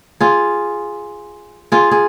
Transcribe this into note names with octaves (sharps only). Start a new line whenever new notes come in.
F4 G#4
F4 G#4
G#4